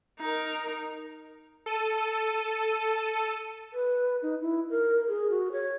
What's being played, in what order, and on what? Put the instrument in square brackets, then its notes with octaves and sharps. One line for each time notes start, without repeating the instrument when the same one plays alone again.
[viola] D#4 A#4
[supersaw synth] A4 D#7
[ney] B4
D#4
E4
A#4
G#4
F#4
C#5